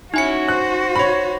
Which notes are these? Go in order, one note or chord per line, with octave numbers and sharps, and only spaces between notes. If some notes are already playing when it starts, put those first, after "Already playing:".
C#4 D#4 E4 F#4 G#5 C#7
C5 F#6
C#5 B5